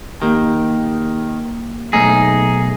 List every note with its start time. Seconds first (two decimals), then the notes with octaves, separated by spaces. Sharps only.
0.22 D#3 A#3 G4
1.93 B1 A3 D#4 G#4